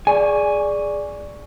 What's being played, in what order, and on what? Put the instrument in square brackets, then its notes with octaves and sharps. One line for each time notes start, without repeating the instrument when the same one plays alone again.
[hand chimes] G#4 D5 C#6 [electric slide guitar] G#5